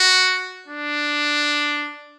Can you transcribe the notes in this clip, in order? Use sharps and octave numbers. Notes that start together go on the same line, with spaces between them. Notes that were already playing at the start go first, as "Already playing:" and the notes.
Already playing: F#4
D4